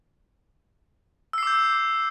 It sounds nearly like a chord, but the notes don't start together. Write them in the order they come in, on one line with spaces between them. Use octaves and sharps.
E6 C7 D6 G6